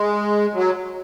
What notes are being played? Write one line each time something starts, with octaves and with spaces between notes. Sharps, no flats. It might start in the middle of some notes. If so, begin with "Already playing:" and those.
Already playing: G#3
F#3